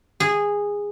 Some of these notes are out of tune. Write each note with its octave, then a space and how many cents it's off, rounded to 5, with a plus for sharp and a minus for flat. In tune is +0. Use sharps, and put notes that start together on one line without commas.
G#4 -15